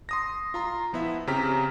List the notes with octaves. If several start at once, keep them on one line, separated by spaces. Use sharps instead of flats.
C6 D#6 A#6
F4 A#5 C6
F3 B3 E4 E5
C#3 C4 G4 A#5 F6 B6